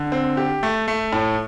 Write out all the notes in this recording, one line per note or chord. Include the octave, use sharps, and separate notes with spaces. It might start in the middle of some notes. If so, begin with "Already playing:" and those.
Already playing: D3
C4
G4
A3
A3
A2